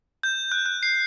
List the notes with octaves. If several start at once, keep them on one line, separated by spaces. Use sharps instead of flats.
G6
F#6
F#6
C7